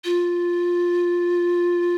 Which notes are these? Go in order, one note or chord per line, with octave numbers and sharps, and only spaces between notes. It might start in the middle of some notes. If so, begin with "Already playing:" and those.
F4